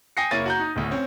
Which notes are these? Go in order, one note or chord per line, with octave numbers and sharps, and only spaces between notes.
G5 G#5 D#6 A#6 C7 C#7
F#1 A#3 E4 C#5 A6 D#7
F#4 A#5 G6
D#4
D1 D2
C4 C#4